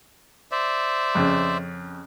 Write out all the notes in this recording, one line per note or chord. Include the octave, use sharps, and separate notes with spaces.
C5 D5 E5
F2 C#3 C#4